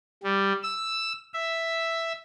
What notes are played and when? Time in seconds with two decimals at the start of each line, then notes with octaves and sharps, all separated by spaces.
0.23 G3
0.63 E6
1.34 E5